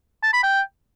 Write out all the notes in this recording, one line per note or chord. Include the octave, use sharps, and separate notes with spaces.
A5
B5
G5